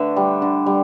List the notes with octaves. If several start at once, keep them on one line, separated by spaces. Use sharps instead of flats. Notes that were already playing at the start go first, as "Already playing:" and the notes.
Already playing: D3 A3 B4 E5
G3
D3
G3